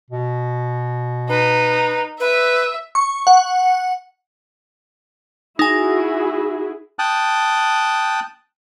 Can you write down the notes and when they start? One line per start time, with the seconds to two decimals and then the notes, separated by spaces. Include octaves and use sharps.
0.11 B2
1.29 D#4 B4
2.20 B4 E5
2.95 C#6
3.27 F#5
5.59 D#4 E4 F#4 G#4 G#5
6.99 G5 A5 D#6 F#6